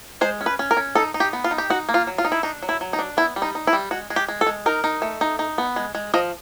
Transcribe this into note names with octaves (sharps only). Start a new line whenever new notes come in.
G#3 C5
C#4
B4
C#4
A#4
C#4
D#4 A4
D#4
G4
B3
F4
D#4
G4
D#4 F#4
A#3
F4
F#3
F4
D#4
E4
D4 D#4
F#3
E4
F#3
D#4
D4
B3 E4
G3
D#4
D#4
E4
G3
G#3 F#4
G#3
G4
G#3
A4
G#3
D#4 A#4
D#4
A3
D#4
D#4
B3
G#3
G#3
F3 D#5